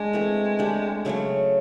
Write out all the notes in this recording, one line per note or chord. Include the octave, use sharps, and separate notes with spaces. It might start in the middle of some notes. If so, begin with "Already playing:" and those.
Already playing: G#3 D4
E3 A3 C4
A3 D4 G4
C#3 F#3 A3 C#4